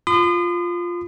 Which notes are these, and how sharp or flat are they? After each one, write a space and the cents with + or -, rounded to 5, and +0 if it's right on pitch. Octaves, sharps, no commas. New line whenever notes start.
F4 +0 C6 -45 D#6 -35